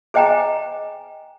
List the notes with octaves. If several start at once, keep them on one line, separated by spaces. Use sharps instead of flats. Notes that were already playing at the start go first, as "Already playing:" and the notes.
G#4 C5 D#5 G5 G#5 A#5